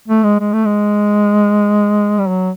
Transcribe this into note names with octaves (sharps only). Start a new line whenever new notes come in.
A3
G#3
G#3
A3
G#3
G3
F#3